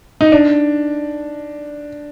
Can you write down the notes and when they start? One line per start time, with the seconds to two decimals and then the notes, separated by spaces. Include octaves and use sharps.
0.21 D#4
0.32 D4